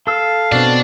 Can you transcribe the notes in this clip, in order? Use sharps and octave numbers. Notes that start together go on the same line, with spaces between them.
A4 F5 E6
B2 C4 D4